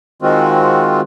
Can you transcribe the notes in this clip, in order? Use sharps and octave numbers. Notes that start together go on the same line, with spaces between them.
D#3 G#3 C4 F4 F#4